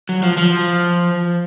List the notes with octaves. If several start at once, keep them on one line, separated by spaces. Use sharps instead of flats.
F#3
F3
F3